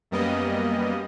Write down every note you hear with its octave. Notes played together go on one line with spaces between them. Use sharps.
F#2 G3 A#3 B3 D#5